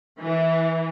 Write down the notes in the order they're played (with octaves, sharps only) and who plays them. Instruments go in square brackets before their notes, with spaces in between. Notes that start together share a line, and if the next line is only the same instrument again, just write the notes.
[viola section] E3